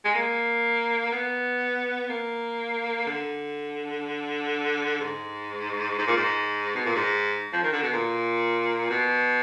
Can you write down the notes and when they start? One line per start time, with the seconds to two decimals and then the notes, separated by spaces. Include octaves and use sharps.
0.05 G#3
0.15 A#3
1.12 B3
2.10 A#3
3.07 D3
5.01 G#2
5.99 G#2
6.08 A#2
6.17 G#2
6.75 B2
6.86 A#2
6.95 G#2
7.53 F3
7.63 D#3
7.73 D3
7.83 B2
7.93 A#2
8.90 B2